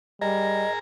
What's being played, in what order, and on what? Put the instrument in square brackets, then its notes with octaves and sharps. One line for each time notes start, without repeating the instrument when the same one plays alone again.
[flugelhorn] G3 [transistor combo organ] G#4 A#4 A#5 [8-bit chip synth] D#5